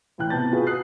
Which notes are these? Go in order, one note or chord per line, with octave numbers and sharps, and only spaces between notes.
A2 E3 G5 F#6
C3 B3 A5 G6 A6
F4 F#4 G#4 B4
D#6 F#6 C7